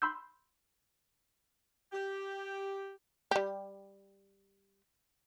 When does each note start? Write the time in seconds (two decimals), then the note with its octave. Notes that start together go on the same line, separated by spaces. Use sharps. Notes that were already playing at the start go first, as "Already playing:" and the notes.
0.02 B5 C6 E6 G6
1.92 G4
3.31 G3 G4